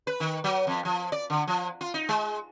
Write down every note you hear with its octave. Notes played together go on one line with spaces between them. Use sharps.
B4
D#3
F#3
F2
F3
D5
D3
F3
F4
D#4
G#3